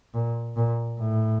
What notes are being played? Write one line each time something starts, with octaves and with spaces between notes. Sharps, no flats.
A#2
A#2
A2